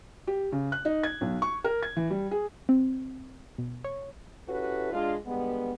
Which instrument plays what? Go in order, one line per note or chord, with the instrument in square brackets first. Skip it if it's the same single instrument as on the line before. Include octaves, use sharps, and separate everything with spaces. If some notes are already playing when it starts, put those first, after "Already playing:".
[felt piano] G4
C#3
F#6
D#4
G#6
B1
C#6
A#4
G#6
E3
G3
G#4
[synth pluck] C4
B2
C#5
[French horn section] C#4 E4 F#4 G4 A4 B4
G#3 D4 F4
D3 G3 G#3 B3